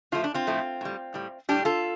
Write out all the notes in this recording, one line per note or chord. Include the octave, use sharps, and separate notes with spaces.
A2 F3 A3 F4
D4
C4 F4
A2 F3 A3
A2 G3
A2 G3
A2 G3 D4 G4
F4 A4